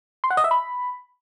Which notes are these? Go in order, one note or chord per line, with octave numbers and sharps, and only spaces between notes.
C6
F#5
D#5
E5
B5